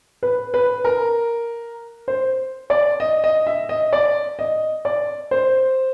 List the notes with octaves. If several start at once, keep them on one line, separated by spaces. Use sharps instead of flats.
B4
B4
A#4
C5
D5
D#5
D#5
E5
D#5
D5
D#5
D5
C5